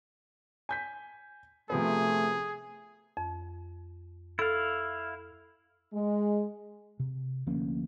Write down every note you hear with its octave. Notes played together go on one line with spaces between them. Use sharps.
G#5 G6 B6
C3 F3 A3 B3 G#4
F2
E4 A4 F5
G#3
C3
D2 F3 A#3 C#4